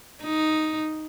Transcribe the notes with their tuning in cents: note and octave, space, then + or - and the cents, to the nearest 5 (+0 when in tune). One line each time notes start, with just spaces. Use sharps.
D#4 +0